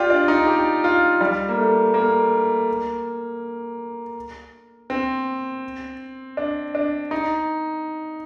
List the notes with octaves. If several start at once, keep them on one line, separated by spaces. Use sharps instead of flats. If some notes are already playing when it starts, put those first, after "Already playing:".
Already playing: F4 G4 D5
D4
D#4
G4
F4
G3
A#3
A3
A#3
C4
D4
D4
D#4